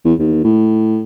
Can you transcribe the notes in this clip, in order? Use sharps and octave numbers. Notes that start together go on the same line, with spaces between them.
E2
D#2
A2